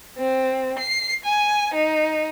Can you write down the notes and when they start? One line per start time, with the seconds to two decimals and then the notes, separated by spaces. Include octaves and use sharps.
0.18 C4
0.79 C7
1.25 G#5
1.75 D#4